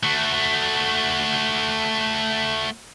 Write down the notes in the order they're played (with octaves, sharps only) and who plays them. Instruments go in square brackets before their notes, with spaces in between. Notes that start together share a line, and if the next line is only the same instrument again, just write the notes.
[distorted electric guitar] A3 F#4